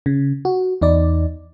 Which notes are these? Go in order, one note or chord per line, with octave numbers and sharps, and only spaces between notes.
C#3
F#4
E2 D#4 D5